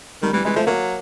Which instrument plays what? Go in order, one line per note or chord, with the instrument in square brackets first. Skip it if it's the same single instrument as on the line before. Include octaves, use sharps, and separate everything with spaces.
[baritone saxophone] D#3 [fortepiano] G3
[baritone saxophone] E3 [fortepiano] G3
[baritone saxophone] E3 [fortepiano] G#3
[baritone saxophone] F3 [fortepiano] A3
[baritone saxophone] F#3 [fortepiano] A#3